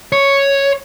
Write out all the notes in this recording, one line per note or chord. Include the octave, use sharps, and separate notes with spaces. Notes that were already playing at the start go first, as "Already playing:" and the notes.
C#5